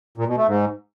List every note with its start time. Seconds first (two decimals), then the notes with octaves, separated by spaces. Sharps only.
0.18 A#2
0.27 B2
0.37 A3
0.47 G#2